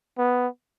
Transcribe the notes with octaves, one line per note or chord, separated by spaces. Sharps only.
B3